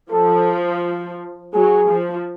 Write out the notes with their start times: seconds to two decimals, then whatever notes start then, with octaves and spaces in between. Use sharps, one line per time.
0.11 F3 A4
1.54 F#3 G#4
1.89 F3